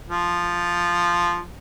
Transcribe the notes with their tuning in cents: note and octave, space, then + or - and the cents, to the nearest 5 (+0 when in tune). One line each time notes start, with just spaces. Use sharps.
F3 +0